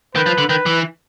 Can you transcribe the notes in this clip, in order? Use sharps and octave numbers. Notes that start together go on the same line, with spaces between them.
D#3 B4
F3
D3
D#3 B4
E3